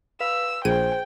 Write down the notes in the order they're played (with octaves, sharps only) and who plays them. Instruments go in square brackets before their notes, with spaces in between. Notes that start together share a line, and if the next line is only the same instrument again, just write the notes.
[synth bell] B4 F5 [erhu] E6
[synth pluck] A#1 D#7 [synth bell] G#4 [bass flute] C5 [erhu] G5